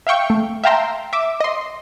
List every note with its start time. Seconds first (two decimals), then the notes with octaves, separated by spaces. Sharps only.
0.07 E5 F5 G5 C#6
0.30 A3
0.64 E5 F5 G5 A5 A#5 C6
1.13 E5 D6
1.40 D#5 C6